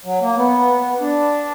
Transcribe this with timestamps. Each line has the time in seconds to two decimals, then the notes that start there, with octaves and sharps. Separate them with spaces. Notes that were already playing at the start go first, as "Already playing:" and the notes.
0.05 F#3
0.21 A#3
0.36 B3
1.00 D4